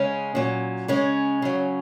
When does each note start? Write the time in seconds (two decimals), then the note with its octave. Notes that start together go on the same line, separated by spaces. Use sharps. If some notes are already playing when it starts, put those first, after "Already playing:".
Already playing: C#3 G#3 C#4
0.35 A#2 F#3
0.88 C#3 G#3 C#4
1.42 C#3 F#3